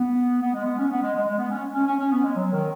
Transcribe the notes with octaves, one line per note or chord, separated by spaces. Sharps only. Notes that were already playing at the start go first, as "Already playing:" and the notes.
Already playing: B3
B3
G#3
B3
C#4
B3
G#3
G#3
G#3
B3
C#4
C#4
C#4
C#4
B3
G#3
F#3
D#3